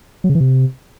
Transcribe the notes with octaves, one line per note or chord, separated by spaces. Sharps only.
F#3
C#3
E3
C3